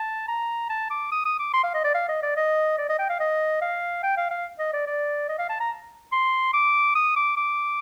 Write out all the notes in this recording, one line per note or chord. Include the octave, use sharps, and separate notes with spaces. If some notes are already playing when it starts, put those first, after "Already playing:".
Already playing: A5
A#5
A5
D6
D#6
D#6
D6
C6
F5
D#5
D5
F5
D#5
D5
D#5
D5
D#5
G5
F5
D#5
F5
G5
F5
F5
D#5
D5
D5
D#5
F5
A5
A#5
C6
D6
D#6
D6
D6